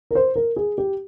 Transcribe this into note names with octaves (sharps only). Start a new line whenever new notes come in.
A#4
C5
A#4
G#4
G4